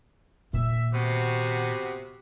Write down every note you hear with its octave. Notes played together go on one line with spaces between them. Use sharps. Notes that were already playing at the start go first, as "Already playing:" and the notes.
A#2 D#3 E5
C3 B3 F#4